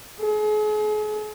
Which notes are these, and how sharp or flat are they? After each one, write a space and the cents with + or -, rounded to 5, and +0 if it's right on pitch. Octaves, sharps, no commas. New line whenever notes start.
G#4 +40